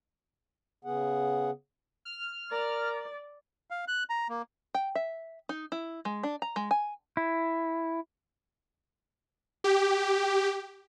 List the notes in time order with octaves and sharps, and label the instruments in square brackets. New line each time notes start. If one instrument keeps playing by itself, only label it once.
[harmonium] C#3 B3 G#4 F#5
[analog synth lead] F6
[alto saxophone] A#4 [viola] D5
[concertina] F5
F#6
A#5
A#3
[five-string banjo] G5
E5
D#4
E4
G#3
D4
A#5
G#3
G#5
[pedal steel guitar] E4
[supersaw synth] G4